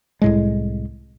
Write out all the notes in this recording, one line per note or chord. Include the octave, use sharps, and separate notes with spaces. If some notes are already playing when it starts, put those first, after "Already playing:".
C2 A2 G#3